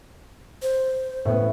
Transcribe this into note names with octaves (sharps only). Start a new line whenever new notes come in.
C5
A2 B3